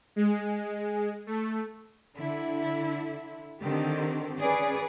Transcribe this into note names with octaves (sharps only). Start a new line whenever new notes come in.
G#3
A3
D3 E4
D3 D#3 C4 G4
C#4 G#4 B4 D5